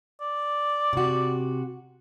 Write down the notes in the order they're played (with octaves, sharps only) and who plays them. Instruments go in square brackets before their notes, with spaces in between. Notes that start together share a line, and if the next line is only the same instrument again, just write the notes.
[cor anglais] D5
[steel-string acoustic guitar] C3 F#4